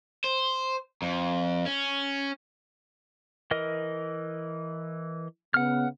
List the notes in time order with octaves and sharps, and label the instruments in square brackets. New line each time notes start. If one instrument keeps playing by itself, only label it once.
[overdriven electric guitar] C5
F2
C#4
[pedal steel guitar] E3 A#4 D#5
[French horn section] C#3 B3 [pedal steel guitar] F#5 F6